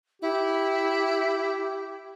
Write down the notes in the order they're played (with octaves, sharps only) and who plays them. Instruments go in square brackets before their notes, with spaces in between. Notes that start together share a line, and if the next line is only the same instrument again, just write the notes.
[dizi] E4 [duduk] G4